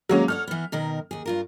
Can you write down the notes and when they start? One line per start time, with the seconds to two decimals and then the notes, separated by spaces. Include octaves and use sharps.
0.09 D#3 F#3 G#3 A#3 C#4 A#5
0.28 A4 C#5 F#5 F6
0.47 E3 B3
0.72 B2 D#3 A#4
1.11 D#2 G#4
1.26 G2 F4 A#4